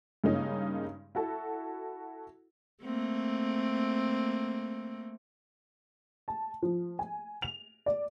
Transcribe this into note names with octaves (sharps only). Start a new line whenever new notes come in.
G2 C#3 G#3 A#3 C#4 D#4
E4 F#4 A4
A3 A#3 C4
A5
F3
G#5
F7
D5